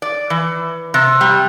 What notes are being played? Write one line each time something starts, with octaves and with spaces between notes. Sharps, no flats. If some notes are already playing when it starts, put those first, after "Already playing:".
D5
E3
C3
G3